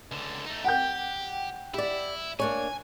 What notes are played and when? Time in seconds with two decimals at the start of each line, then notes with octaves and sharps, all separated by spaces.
0.11 C#2 D3
0.46 A3 D#4
0.64 G4 F#5 G5 G6
1.74 E4 G4 D5
2.40 A#3 D4 C#5 G#5